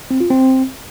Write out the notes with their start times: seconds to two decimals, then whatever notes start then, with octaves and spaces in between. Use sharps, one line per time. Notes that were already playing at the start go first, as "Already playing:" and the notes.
0.11 C4
0.20 F4
0.30 C4